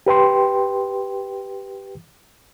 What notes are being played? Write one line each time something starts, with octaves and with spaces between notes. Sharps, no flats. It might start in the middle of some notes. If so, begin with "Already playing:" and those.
G4 B4 G5 C6